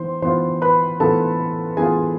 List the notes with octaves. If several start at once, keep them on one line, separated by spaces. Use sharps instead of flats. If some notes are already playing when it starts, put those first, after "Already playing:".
Already playing: E3 B3 C5 C6
E3 B3 F4 C5 C6
B4 B5
E3 B3 F4 A4 A5
E3 B3 F4 G#4 G#5